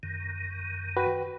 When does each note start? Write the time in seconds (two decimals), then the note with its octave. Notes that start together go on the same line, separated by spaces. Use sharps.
0.03 F#2 D#3
0.97 F#4 B4 G5